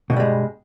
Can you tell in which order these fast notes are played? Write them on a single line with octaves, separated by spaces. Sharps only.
B2 G2 G3 G#3